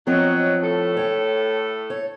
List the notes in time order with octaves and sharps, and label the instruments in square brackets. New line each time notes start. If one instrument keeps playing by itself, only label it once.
[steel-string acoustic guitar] F3 C4 C#5 [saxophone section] F#3 D#5
[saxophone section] A2 A3 A4
[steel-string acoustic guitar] C#5 G5
C#5